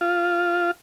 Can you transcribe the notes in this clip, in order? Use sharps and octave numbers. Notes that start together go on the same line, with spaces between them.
F4